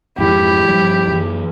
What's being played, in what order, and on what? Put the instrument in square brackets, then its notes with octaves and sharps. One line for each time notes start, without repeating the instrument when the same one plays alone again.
[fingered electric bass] F2 G#2 E3 [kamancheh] E4 G4
[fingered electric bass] G2 F3 G3
F#2 E3